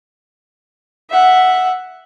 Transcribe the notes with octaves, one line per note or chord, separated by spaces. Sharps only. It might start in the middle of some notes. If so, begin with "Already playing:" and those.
E5 F#5